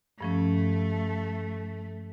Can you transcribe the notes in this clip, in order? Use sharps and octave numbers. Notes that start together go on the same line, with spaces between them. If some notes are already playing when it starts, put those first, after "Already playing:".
G2 F3 A3 C#4